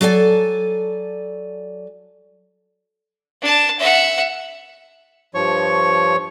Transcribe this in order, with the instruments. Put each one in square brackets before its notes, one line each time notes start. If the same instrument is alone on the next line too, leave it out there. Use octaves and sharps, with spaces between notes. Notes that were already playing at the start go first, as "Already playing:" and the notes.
[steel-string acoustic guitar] F#3 A4 D5 G#5
[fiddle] D4 A5
E5 F#5
[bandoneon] G2 F3 C#5 C#6